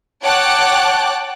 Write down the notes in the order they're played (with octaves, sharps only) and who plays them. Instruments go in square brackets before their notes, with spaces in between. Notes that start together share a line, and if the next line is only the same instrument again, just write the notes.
[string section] C#5 F#5 G5 A5 D6 F#6